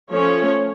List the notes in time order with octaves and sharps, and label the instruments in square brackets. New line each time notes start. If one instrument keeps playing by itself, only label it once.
[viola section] F3 A3 C#4 C#5